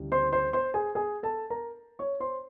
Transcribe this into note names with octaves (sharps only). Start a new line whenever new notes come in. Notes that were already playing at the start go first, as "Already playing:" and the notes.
Already playing: D2 C#3 E3 G3
C5 C6
C5 C6
C5 C6
G#4 G#5
G#4 G#5
A4 A5
A#4 A#5
C#5 C#6
C5 C6